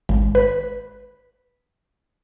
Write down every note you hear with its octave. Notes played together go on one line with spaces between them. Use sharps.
G#1
B4